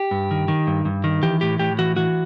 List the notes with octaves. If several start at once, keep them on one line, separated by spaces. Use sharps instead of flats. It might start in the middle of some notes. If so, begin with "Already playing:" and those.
Already playing: G4
G2
D#3
D#3
G2
G2
D#3
E3 G4
A2 G4
A2 G4
E3 F#4
E3 F#4